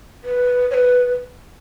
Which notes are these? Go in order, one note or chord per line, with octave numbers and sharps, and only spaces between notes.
B4
C#5
B4